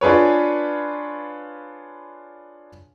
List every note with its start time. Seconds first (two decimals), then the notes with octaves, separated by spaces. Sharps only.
0.01 D4 F4 G#4 B4 C#5